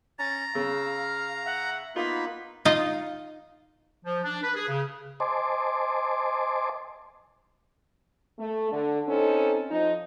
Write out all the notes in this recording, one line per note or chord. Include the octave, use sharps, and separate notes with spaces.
C#4 A#5 A6
C#3 F5 E6
F6
E5 F#5
A#3 B3 D#4 F4 F#4 B5
D#4 F4 D#5 F5
F3
D4
B4
G#4
C#3
C5 D#5 G#5 A5 C6 D6
A3
D3
C4 C#4 D#4 A4
F3 D#4